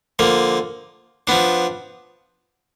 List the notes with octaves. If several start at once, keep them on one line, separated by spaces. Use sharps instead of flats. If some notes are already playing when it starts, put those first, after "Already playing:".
D3 F3 A#3
F3 B3 D4